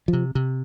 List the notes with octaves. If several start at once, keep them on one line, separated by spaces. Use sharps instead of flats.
F3
C3
C3